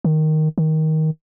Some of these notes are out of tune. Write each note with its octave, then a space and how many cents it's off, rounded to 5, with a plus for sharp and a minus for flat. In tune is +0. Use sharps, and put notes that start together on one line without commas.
D#3 +0
D#3 +15